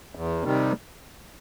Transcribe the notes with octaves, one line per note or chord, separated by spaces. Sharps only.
E2
C3 D#3 G3